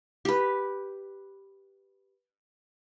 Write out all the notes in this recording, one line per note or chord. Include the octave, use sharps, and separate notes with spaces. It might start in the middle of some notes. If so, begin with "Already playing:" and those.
G4 B4